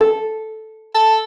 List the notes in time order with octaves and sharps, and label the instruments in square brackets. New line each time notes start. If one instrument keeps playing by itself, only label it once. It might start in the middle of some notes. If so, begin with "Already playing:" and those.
[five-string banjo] A4
[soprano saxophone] A4